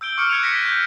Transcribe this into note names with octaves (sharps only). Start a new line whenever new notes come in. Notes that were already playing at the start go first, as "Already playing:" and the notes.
E6 G6 D7 G7
C#6 D6 F6 C#7 D7
F#6 G#6 C#7 D#7 F7
F#6 A#6 B6 C#7 D#7
G6